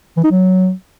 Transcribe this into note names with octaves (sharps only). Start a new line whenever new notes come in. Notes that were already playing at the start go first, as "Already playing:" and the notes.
E3
D#4
F#3